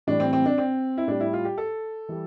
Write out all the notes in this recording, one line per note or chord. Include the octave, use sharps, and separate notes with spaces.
A2 E3 G3 D4
C4
C4
D4
C4
E4
A2 G3 D4
E4
F4
G4
A4
E3 G3